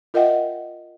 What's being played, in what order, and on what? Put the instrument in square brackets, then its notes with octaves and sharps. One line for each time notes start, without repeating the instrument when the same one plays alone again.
[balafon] F4 A#4 D#5 E5 F#5 G5